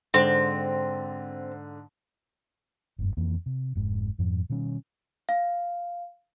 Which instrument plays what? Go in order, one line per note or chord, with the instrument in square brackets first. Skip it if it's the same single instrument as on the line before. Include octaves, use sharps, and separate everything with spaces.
[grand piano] G#2 D3 [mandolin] C4
[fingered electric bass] F1 G2
F2 E3 A#3
C3
F1 G#2
F2 G#2 F3
B2 D#3 G3 C#4
[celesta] F5